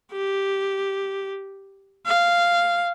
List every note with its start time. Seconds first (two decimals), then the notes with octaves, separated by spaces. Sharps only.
0.13 G4
2.06 F5